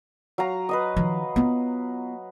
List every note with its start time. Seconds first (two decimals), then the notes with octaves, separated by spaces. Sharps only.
0.38 F#3 F5 A#5
0.69 B4 D#5 D#6
0.97 D#3 F3
1.36 B3 F4